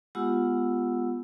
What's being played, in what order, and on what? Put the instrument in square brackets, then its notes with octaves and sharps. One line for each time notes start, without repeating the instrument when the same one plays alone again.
[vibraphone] G#3 B3 F4 G4 F#5 E6